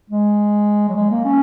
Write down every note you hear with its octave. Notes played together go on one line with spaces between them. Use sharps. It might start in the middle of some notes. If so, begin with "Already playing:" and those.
G#3
F#3
G#3
A#3
C#4